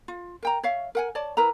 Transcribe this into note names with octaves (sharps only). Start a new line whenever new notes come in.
F4
A#4 G5 A#5
C#5 E5 F5
A#4 F#5 G#5
C#5 D5 A5
E4 A#4 B4 A#5